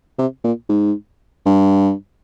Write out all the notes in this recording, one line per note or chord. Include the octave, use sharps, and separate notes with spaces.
C3
A#2
G#2
G2